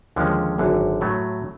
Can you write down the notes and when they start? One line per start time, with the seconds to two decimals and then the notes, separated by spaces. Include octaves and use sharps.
0.16 D#2 D3 F3 G#3 C#4
0.58 G#1 F#2 D3
1.01 A2 F#3 A3